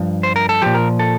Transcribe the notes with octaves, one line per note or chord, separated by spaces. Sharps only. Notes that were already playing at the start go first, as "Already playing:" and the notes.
Already playing: G2 F3
C5
A#4
A4
A#2 F3 G4
A#4
A4